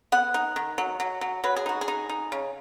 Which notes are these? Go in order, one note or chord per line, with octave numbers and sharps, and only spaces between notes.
B3 F#5
D#4
D#3
F#3
F#3
F#3
F#3 B4
G#4
D#4 F#4
G#4
D#4
D#4
C#3